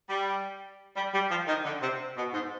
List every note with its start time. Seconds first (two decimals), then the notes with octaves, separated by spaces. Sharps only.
0.09 G3
0.96 G3
1.13 G3
1.30 F3
1.47 D#3
1.64 D3
1.82 C3
2.17 B2
2.33 G#2